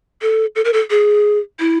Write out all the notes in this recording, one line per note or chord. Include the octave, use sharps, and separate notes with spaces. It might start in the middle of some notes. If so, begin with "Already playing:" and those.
A4
A4
A#4
A4
G#4
E4